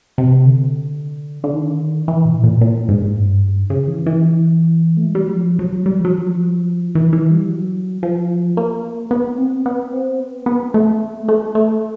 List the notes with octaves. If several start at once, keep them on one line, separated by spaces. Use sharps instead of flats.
C3
D3
D3
D#3
E3
A#2
A#2
A#2
G#2
G2
C#3
E3
E3
A3
G#3
G3
F#3
F3
F#3
G3
F3
F#3
F3
E3
E3
G3
F#3
F3
A#3
B3
C4
B3
C4
B3
B3
A3
A3
A3